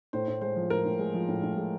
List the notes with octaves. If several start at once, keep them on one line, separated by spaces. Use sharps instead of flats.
A2 C5
A2
G#3 C5
F3
A2 A#4
A2
G#3
F3
A2
A2
G#3